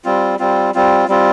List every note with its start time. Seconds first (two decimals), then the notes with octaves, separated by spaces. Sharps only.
0.05 G3 C4 F4
0.39 G3 C4 F4
0.74 G3 C4 F4
1.09 G3 C4 F4